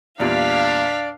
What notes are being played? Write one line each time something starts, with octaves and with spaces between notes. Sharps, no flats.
E2 A#2 G3 D4 D5 F5 B6